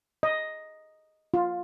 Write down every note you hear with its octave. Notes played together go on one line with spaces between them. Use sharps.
D#5
F4